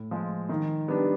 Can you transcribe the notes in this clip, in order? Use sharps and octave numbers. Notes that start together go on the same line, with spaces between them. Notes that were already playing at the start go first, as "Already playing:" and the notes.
Already playing: A2
F3 G#3
D#3
G3 B3 D4